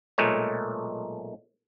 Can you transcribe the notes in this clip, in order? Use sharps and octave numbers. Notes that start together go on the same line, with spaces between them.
B1 A#2 G#3 A3 C#5